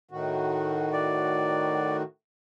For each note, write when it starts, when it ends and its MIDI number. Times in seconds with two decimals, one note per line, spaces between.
0.11 2.03 45
0.11 2.03 51
0.11 2.03 66
0.93 1.97 74